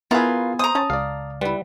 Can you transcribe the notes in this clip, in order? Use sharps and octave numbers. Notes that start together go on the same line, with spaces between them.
B3 E4 F4 G#4 A#4 B4
C5 A#5 D#6
C#4 A5
C#2 D5 F5
G3 B3 E4